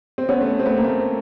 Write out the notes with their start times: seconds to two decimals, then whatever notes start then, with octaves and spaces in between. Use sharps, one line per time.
0.18 C4
0.29 B3 C#4
0.41 A3
0.59 C4
0.66 A3 B3
0.77 A#3
0.84 A3